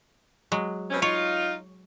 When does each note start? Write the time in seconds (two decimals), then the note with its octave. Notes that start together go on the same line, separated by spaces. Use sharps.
0.52 F#3 G#3
0.91 B2 C4 C#4
1.02 D#4 F4 C#5